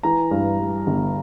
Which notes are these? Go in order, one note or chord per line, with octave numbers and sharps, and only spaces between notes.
E3 A#5
G2
G3
G1